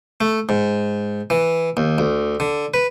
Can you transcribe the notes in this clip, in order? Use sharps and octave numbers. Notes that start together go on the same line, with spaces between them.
A3
G#2
E3
D#2
D2
D3
B4